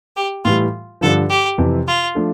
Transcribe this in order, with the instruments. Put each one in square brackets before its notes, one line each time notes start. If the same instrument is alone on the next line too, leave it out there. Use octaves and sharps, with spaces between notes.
[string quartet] G4
[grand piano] A2 E3 G3 [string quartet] F4
[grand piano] G2 D3 F3 [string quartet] A4
[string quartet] G4
[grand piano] F2 C3 E3
[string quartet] F4
[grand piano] F3 A3 D4 A4